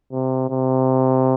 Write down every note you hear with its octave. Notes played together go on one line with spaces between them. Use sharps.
C3
C3